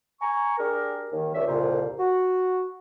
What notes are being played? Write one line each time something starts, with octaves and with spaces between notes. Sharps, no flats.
G#5 A#5 C#6
D4 G4 G#4 A#4
D#2 D#3
C#2 C#4 D4 E5
C2 F2 A#2 C#3 F4 C5
F#4